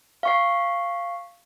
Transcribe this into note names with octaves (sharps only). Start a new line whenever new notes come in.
F5 C#6 C7